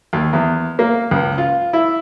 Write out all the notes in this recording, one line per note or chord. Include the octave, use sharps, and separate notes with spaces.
D#2
E2
A#3
C#2
F4
E4